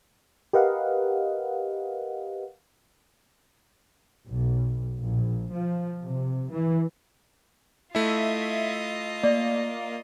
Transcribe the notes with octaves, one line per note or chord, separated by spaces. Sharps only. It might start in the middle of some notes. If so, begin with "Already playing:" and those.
G4 A#4 B4 D#5 F5 F#5
B1
A#1
F3
C3
E3
A3 E4 F4 D#5 E5
A#3 D5